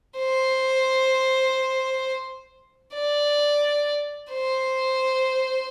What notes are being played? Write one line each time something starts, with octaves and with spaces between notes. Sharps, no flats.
C5
D5
C5